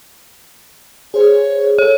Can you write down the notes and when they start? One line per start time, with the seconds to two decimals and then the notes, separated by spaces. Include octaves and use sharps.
1.14 G#4 C5 C#5
1.78 A4 C#5